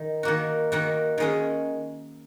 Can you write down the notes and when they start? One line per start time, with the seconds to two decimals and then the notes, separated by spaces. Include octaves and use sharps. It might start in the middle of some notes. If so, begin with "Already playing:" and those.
Already playing: D#3
0.23 D#3 A#3 F#4
0.72 D#3 A#3 F#4
1.18 D#3 G#3 C#4 G#4